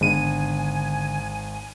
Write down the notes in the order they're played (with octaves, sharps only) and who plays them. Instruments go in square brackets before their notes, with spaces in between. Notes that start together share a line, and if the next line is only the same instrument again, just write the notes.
[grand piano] G#1 [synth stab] G#2 D#7 [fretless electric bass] D3 B3 D4 [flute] G#5